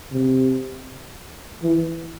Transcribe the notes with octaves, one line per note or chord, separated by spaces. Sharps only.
C3
E3